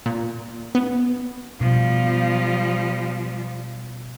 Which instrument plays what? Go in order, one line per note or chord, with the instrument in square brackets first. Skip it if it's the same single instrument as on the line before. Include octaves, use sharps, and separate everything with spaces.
[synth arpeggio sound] A#2
B3
[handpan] B2 [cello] F3 G3